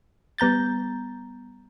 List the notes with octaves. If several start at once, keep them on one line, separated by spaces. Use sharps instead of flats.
G3 B3 A#5 G6 A6